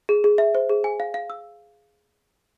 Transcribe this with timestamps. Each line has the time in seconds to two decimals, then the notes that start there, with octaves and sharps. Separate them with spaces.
0.09 G#4
0.24 G#4
0.38 E5
0.55 C5
0.69 G#4
0.84 G#5
1.00 F5
1.14 F5
1.30 E6